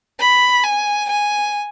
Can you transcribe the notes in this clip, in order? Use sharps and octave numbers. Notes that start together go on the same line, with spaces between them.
B5
G#5
G#5